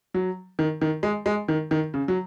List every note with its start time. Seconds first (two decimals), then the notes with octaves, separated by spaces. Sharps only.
0.14 F#3
0.59 D#3
0.81 D#3
1.03 G#3
1.26 G#3
1.48 D#3
1.71 D#3
1.94 C#3
2.08 F#3